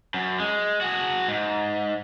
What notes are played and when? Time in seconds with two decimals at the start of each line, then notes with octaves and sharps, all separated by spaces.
0.14 F#2
0.40 G#3
0.81 F#4 G#4
1.28 G#2